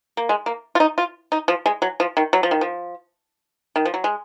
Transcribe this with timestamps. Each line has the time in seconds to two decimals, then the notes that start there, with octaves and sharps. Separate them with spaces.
0.17 A#3
0.29 G#3
0.46 A#3
0.75 F4
0.80 D#4
0.98 F4
1.32 D#4
1.48 F3
1.66 G#3
1.82 F#3
2.00 F3
2.17 D#3
2.33 F#3
2.43 F3
2.51 D#3
2.61 F3
3.76 D#3
3.85 F3
3.94 F#3
4.04 G#3